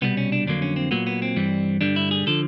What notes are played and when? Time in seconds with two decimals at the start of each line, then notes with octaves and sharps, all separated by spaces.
0.02 C2 B2 G3 B3
0.17 C#4
0.32 D4
0.47 F2 D3 F#3 A#3 D4
0.62 C#4
0.76 C4
0.91 A#2 F#3 A#3 B3
1.07 B3
1.22 C4
1.36 G2 E3 G3
1.81 G2 D3 G3 D4
1.96 E4
2.11 G#4
2.27 D3 F3 A4